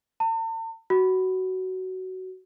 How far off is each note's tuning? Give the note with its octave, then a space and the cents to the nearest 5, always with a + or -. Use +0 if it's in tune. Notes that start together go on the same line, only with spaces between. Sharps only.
A5 +45
F#4 +15